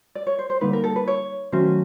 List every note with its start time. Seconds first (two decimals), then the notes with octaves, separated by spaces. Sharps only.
0.15 D5
0.27 C#5
0.39 C5
0.50 C5
0.61 D3 G3 A#3 D#4 B4
0.73 A#4
0.84 A4
0.96 B4
1.08 C#5
1.52 D#3 F#3 A3 C#4 F#4 C5